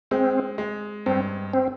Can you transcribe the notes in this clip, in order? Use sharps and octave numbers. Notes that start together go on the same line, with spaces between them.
G#3 C4
G#3
G2 C4
C4